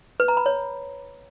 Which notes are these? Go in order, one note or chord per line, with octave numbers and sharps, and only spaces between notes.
B4
A#5
B5
C#5